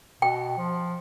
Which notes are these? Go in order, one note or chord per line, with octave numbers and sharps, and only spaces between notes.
B2 G5
F3